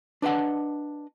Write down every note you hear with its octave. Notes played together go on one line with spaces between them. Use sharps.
D4 B4 D#5 F#5 A5